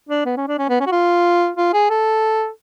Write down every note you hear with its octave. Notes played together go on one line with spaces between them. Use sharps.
D4
B3
C#4
D4
C#4
B3
C#4
F#4
F4
F4
G#4
A4